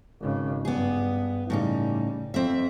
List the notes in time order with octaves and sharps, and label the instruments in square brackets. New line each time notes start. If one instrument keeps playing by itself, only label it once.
[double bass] G#1 C#3
[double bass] G2 [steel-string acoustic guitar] B3 G#4
[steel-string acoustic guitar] A2 C#3 D#4 [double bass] G3
[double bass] F2 [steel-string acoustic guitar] C4 E5